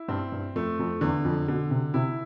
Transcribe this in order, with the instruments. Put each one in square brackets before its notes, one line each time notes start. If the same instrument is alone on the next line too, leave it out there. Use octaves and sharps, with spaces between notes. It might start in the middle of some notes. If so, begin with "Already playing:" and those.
Already playing: [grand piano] E4
[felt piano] G2 [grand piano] C4
[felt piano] G2
[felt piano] F2 [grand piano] A3
[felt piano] F2
[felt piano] E2 [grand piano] D3
[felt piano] F2
[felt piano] B2 [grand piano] D3
[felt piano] C3
[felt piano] C3 [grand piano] E4